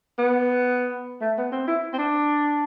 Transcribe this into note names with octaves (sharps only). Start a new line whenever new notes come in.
B3
A3
B3
C4
E4
C4
D4